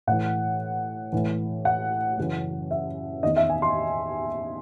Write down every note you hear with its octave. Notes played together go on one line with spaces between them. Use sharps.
A2 E3 F#5
A2 E3
F#5
F#2 C#3 E3
E5
E2 D#3 D#5
E5
G#5
C6